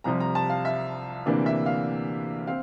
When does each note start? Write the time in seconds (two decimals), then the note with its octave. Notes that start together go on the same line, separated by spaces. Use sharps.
0.04 C2 C3 F3 A#5
0.20 A#5
0.35 A5
0.50 F5
0.65 E5
1.26 D2 C3 E3 A#3 D4 D5
1.46 E5
1.66 F5
2.47 C4 F5